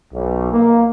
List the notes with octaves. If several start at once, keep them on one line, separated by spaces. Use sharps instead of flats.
B1
A#3